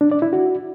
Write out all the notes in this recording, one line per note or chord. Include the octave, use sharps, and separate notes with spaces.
D4
D5
E4
F#4